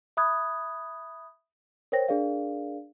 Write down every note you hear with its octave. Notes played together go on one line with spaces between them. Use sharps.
E5 B5 D#6 F#6 G#6
A#4 C5 C#5 G5 A#6
D4 G#4 A#4 D5 F5